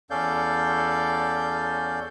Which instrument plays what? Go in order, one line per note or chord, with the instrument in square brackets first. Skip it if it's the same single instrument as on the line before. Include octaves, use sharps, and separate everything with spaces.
[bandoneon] E2 C#4 A4 D5 F5 G6